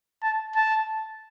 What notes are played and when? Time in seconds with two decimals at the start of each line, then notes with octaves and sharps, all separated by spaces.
0.23 A5
0.56 A5